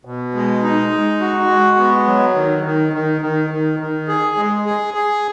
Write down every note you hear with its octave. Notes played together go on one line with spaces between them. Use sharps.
B2
G#3
D#4
G#3
F#4
G#3
B3
F#3
D#3
D#3
D#3
D#3
D#3
D#3
G#4
G#3
G#4
G#4